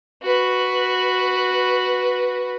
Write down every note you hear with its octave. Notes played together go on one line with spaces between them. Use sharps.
F#4 B4